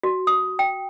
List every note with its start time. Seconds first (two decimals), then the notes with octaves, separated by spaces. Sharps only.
0.03 F#4
0.27 D#6
0.59 G5